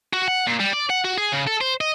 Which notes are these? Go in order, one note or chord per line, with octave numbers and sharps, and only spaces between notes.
F#4
F#5
A#2
G3
D5
F#5
F#4
G#4
C#3
A4
C5
D#5